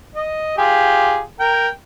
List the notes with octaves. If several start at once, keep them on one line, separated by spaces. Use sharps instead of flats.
D#5
F4 G4 G#4
A#4 G5